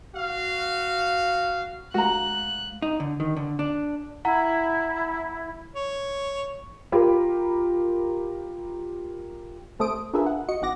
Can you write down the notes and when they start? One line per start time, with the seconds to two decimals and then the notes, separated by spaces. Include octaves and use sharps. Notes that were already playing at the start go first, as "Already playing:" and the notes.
0.16 F#4 F5
1.94 G#3 A3 F#4 F5 A#5 F#6
2.82 D#4
3.00 D3
3.20 D#3
3.36 D3
3.59 D4
4.25 E4 F#5 A#5
5.76 C#5
6.92 F4 G4 A#4 B5
9.79 C3 A3 A4 C5 D#6 D7
10.13 D4 F4 G#4 A#4 B4 E5
10.26 F#5
10.49 F#4 D#5 C#7
10.62 G#1 E3 F#5 D6 A#6